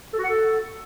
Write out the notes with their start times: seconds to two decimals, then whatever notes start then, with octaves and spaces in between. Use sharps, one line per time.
0.13 A4
0.18 F#4
0.24 F#5
0.29 A4